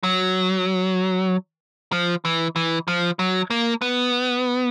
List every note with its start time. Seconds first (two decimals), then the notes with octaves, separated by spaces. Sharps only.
0.03 F#3
1.92 F3
2.25 E3
2.56 E3
2.88 F3
3.19 F#3
3.50 A#3
3.82 B3